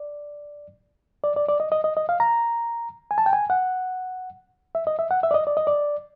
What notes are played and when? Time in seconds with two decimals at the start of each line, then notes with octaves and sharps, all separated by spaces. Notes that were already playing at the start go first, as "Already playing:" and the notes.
Already playing: D5
1.24 D5
1.36 D5
1.48 D5
1.60 D#5
1.72 D#5
1.84 D#5
1.97 D#5
2.09 F5
2.20 A#5
3.11 G#5
3.18 A5
3.26 G5
3.33 G#5
3.50 F#5
4.75 E5
4.87 D#5
4.99 E5
5.11 F#5
5.23 E5
5.31 D5
5.34 D#5
5.47 D5
5.57 D#5
5.67 D5